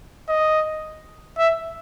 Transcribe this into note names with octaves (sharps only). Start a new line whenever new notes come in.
D#5
E5